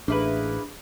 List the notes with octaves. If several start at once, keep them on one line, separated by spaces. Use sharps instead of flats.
A1 A#3 D4 E4 G#4 B4